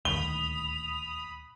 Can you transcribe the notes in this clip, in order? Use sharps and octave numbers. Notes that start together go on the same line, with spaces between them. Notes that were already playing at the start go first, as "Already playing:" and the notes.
D#1 D2 D#3 B5 D#6 F7 G7